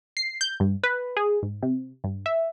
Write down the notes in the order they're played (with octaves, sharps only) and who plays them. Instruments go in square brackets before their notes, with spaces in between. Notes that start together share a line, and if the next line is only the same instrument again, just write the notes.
[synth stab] C7
G6
G2
B4
G#4
G#2
C3
G2
E5